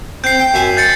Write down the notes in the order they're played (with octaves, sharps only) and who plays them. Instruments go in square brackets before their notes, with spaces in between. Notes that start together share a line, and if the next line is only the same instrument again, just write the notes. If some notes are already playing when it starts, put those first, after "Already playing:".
[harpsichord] C4 [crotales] G6 C7
[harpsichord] G5
F#2 E5 G#5
[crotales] G6 A6 C#7